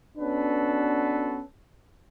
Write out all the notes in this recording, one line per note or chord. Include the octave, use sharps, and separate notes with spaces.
B3 C#4 D4 F#4 A4 B4